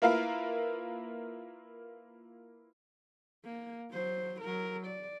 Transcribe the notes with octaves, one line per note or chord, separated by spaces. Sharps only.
A#3 E4 F4 A#4 B4 F5
A#3
F#3 C5
F#3 A#4
D5